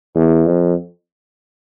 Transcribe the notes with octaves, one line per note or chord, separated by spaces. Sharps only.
E2
F2